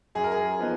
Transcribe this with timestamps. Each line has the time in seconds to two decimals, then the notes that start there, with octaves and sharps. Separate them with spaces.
0.15 F#2 G#4
0.24 A#4
0.31 G#4
0.59 F3 B3 D#4